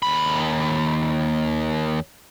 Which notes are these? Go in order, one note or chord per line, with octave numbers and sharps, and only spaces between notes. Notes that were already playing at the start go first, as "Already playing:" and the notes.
D#2 B5